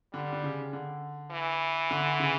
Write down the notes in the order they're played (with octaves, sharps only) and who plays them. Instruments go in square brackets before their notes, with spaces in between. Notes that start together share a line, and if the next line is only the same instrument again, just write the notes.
[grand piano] D3 [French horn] G3
[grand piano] D3
C#3
D3
[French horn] E3
[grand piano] D3
C#3